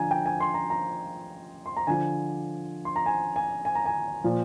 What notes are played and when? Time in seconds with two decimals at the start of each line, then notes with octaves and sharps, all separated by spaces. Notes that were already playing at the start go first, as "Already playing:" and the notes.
Already playing: D3 F3 G#5 A#5
0.11 G5
0.26 G#5
0.40 C6
0.54 A#5
0.70 A#5
1.66 C6
1.77 A#5
1.87 D3 F3 G#5
2.85 C6
2.96 A#5
3.06 G#5
3.36 G#5
3.65 G#5
3.75 A#5
3.86 G#5
4.24 A#2 F3